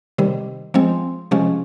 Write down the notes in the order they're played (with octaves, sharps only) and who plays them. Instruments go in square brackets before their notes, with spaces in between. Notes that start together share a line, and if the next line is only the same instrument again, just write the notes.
[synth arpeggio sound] C3 D#3 G3
F3 G#3 C4
C3 F3 G#3 C#4